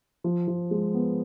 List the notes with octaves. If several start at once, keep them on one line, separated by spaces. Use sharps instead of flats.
F3
F3
G#3
B3